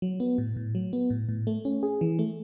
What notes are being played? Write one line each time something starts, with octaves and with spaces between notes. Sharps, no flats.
F#3
B3
A2
A2
F#3
B3
A2
A2
A3
C#4
G#4
E3
A3